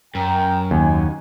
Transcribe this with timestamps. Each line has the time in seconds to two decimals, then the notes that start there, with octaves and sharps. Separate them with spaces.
0.15 F#2 A#4 G5
0.71 D#2 D#4 F#4 G#5